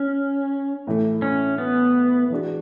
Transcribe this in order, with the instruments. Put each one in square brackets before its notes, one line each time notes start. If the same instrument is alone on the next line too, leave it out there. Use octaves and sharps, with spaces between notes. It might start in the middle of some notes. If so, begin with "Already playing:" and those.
Already playing: [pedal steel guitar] C#4
[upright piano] A2 E3 A3
[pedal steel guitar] C#4
B3
[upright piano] E3 G#3 D4 F#4